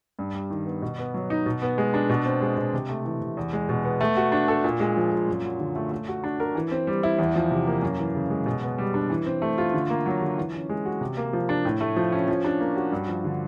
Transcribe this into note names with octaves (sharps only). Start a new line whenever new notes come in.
G2
G3
D#3
B3
B2
B3
F#3
D#4
B2
B3
G#3
D4
B2
C4
G#3
B2
C3
A3
E3
C3
E2
G#3
B2
B3
A3
F#4
D4
A4
A#2
G#3
F3
A#2
F#2
F#3
D3
A3
A3
F#4
D4
A#4
E3
C4
G3
E4
E2
F3
C3
A#3
F#2
E3
C#3
G#3
B2
B3
G3
D4
E3
C4
A3
F4
D3
A#3
F#3
D3
E3
C#4
G#3
F#4
C3
A#3
F3
D4
A2
A3
F3
C#4
F3
D4
A#3
F#4
G2
F3
D3